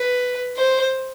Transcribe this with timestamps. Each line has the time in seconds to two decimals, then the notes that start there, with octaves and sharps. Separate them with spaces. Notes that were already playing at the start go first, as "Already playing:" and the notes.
Already playing: B4
0.57 C5